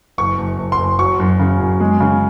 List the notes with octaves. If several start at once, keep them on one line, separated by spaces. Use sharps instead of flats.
F#1 C#6
F#1
F#1
C6
F#1
F#3 C#6
F#2
C#3
F#2
G#3
C#3